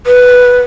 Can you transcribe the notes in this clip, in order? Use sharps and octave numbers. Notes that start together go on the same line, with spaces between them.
B4